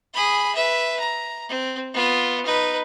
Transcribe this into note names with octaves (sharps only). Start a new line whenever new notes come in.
G#4 B5
B4 E5
A#5
C4
B3 F4
D#4 B4